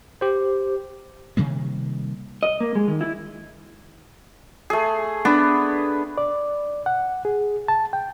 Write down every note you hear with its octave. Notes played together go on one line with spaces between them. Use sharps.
G4 C5
C3 D#3 G3 A#3
D#5
A#3
G#3
D#3
E4
A3 G#4
B3 D4
D5
F#5
G#4
A5
G5